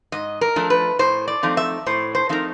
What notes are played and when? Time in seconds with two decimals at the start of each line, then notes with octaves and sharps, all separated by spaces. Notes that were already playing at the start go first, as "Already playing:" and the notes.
0.12 G#2 D#5
0.41 A#4
0.56 F3 A3 D4
0.70 B4
0.99 A2 C5
1.28 D5
1.43 F3 A3 C4 D#4
1.57 E5
1.86 A2 C5
2.15 C5
2.29 F3 A3 C4 D#4 A#4